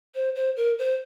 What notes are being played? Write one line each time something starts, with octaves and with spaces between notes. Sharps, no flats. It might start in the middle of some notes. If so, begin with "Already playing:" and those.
C5
C5
A#4
C5